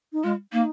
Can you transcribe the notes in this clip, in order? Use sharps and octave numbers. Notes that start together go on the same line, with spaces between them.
D#4
G#3 F4
A#3 D#4